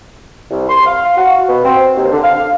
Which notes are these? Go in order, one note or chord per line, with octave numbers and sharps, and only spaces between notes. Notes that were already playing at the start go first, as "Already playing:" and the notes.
C2
C6
F5
F#4
B2
C4
D#2
D3
F5